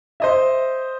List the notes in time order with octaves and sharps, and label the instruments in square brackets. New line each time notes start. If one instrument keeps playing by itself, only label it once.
[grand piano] C5 D#5 E5